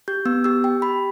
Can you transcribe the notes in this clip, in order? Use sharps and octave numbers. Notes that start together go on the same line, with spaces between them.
G4 G6
B3 E6
G4 E6
G4 G5
G4 B5